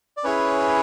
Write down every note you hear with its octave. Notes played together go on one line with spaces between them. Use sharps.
D5
C#4 E4 G#4 B4 C#5